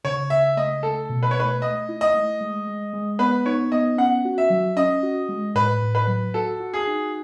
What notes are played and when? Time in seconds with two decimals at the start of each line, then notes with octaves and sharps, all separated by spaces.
0.04 C#3 C#5
0.30 C#3 E5
0.57 A3 D#5
0.83 A3 A4
1.09 B2
1.23 B4
1.31 C#5
1.35 A3 B4
1.62 A3 D#5
1.89 E4
2.01 D#5
2.14 A3
2.40 G#3
2.67 G#3
2.93 G#3
3.19 B3 B4
3.46 D#4 C#5
3.72 B3 D#5
3.98 C#4 F#5
4.25 F#4
4.38 E5
4.50 F#3
4.76 C#4 D#5
5.03 F#4
5.29 G#3
5.55 A2 B4
5.82 A2
5.95 B4
6.07 F#3
6.34 F#4 A4
6.60 F#4
6.74 G#4
6.87 D#4